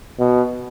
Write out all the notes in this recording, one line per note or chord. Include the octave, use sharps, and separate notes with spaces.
B2